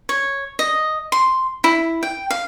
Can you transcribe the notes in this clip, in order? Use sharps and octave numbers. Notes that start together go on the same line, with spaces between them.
C#5
D#5
C6
E4
G5
F5